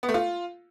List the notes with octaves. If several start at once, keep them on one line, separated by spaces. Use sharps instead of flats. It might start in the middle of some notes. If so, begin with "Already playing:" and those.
B3
A3
F4